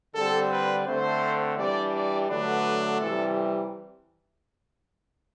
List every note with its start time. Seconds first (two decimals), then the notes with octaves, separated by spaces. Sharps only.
0.15 D3 G3 C4 A4
0.51 B4
0.87 D3 A3 C4 C5
1.58 E3 G3 D4 D5
1.94 D5
2.29 D3 F#3 A3 D4 B4
3.00 C3 E3 G3 A4